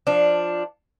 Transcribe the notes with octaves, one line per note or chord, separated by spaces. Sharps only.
F3 D4